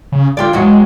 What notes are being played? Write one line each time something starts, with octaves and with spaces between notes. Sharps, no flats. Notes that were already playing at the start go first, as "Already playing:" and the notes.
C#3
D3 F4 G4 D5
E2 F#3 G#3 F#4